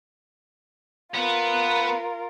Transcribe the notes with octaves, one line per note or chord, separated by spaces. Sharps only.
B3 F4 A#4 B4